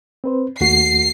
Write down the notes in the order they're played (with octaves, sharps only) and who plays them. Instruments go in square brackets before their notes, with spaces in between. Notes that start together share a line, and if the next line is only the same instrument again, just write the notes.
[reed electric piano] C4 B4 C5
[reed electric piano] D#2 A3 F#4 [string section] C7